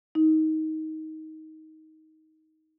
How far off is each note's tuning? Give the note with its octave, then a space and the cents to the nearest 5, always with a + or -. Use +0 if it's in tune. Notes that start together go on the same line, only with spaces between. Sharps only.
D#4 +15